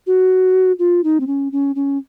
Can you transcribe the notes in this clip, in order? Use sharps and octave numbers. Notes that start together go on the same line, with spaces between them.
F#4
F4
D#4
C4
C#4
C#4
C#4